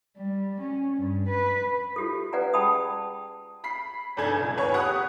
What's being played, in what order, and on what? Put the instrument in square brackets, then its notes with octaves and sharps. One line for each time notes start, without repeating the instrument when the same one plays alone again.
[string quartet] G3
C#4
G2
B4
[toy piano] F4 G4 A4
C#4 B4 D5 F#5 G#5 A#5
G#4 G5 A5 B5 D#6
[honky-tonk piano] B5 B6 C7
F1 B1 D4 A4 G#5 G#6
C#2
D#2 B4 C#5 G#5 C#6
G4 F#5 D#6 F#6